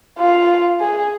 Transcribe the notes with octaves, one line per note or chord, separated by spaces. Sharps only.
F4
G#4